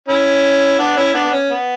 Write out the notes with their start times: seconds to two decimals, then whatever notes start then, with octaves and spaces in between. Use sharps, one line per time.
0.08 C#4 E4
0.79 B3 D4
0.97 C#4 E4
1.14 B3 D4
1.24 B3
1.32 C#4
1.50 B3